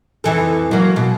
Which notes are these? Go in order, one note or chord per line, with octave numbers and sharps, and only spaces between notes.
F2 E3 A4
F#3 A#3
B2